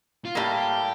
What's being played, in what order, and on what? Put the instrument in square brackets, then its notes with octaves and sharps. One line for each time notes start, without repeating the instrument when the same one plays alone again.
[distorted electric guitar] F4
[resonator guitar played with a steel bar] A2 G3 A#3 [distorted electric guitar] G4